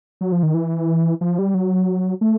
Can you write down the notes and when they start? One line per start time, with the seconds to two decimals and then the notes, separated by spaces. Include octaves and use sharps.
0.21 F#3
0.32 F3
0.43 D#3
0.54 E3
1.21 F3
1.39 G3
1.54 F#3
2.21 A3